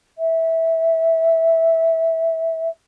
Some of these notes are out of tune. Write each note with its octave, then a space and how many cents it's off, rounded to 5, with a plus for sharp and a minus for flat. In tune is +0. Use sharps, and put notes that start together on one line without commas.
E5 -15